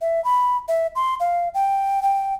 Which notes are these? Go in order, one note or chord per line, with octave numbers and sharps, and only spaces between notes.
E5
B5
E5
C6
F5
G5
G5